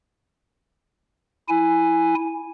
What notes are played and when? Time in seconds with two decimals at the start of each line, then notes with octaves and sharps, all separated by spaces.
1.48 E4 G#5